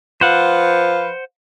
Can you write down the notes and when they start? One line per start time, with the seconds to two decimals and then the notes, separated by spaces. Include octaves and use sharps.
0.21 F3 B4 C5 F5 F#5